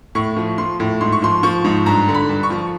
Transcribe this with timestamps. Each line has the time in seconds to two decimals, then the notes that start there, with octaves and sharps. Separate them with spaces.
0.15 A2 C#6
0.37 F3
0.58 F3 C6
0.80 A2
1.01 G#2 C6
1.12 C#6
1.22 F3 C6
1.43 F3 C#6
1.64 G#2
1.86 G2 A#5
2.08 D3
2.15 B5
2.29 G2
2.43 C#6
2.50 F3